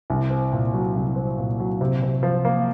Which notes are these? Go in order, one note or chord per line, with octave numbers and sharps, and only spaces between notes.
C2
C4
A#2
F#3
C2
C4
A#2
F#3
C3
C3
F3
A#3